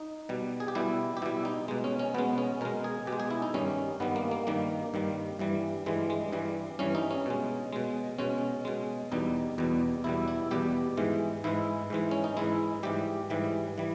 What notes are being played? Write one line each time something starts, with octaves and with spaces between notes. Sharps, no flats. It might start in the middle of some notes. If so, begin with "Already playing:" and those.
Already playing: D#4
B2 G3
G#4
G4
B2 G3 E4
G4
B2 G3 E4
D#4
B2 G#3
C#4
C#4
B2 G#3 B3
C#4
B2 G#3 A#4
G#4
B2 G4
G#3
G#4
E4
D#4
G2 D#3 G3 C#4
G2 D#3 G3 B3
A#3
A#3
G2 D#3 G3 A#3
G2 D#3 G3
G2 E3 G3
G2 E3 G3 G#3
G#3
G2 E3 G3
G2 E3 G3 C#4
D#4
C#4
B2 G#3
B2 G#3
B2 G#3 C#4
B2 G#3
E2 B2 G3 D#4
E2 B2 G3
E2 B2 G3 E4
E4
E2 B2 G3 G4
G#2 E3 G#3
G#2 E3 G#3 E4
G#2 E3 G#3
C#4
D#4
G#2 E3 G#3 E4
G#2 E3 G3 G4
G#2 E3 G3
E3 G3